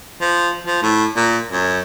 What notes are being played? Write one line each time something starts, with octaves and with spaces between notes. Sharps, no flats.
F3
F3
A2
A#2
F#2